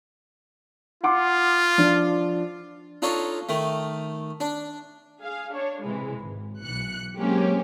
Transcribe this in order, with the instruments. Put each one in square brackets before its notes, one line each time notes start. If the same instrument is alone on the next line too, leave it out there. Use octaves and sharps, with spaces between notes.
[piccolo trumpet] F4 [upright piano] F#5 C6 D6
[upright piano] F3 D4
[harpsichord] D4 D#4 F4 A4 C#5
D#3 A3
D4
[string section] G#4 F5
D4 C#5
C3 E3 G#3
G#1
B1 E3 F#6 C#7
F#3 G#3 A#3 C4 C#4 G4